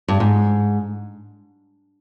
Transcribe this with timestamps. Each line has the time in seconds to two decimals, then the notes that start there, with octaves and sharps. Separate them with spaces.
0.08 G2
0.20 G#2